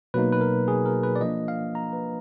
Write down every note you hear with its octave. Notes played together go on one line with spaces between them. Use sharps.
B2 F#3 A#3 D#4 B4
B4
A#4
G#4
A#4
B4
D5
F3 A#3 D4 D#5
F5
A#5
B4